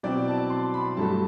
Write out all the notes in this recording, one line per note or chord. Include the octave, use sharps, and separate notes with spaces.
B2 F#3 C4 E4 D5
A5
C6
B5
G2 F#3 A3 A5